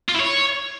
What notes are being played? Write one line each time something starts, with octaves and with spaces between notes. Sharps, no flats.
F4
E4
C#5